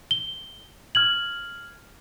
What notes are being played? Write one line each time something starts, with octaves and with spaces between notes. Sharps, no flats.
G7
F6 G#6 F#7